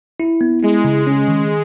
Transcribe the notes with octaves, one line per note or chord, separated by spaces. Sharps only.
E4
B3
G#3 E4
C#3
C#4
D#3